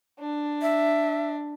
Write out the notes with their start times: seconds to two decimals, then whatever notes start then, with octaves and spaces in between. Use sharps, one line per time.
0.19 D4
0.62 E5